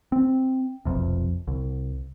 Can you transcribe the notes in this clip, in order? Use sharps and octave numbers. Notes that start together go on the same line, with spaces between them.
C4
F1 B1 F2 C3
C2